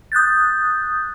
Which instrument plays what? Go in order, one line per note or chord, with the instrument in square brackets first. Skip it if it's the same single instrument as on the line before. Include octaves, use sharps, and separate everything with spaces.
[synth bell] D#6 F#6 G6 A6